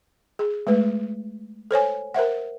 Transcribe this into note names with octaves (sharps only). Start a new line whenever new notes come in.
G#4
G#3 A3 B4
A4 C5 C#5 G#5
A#4 C5 E5 F#5